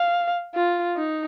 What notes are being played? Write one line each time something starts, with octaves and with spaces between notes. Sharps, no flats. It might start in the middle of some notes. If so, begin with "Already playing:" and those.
Already playing: F5
F4
D#4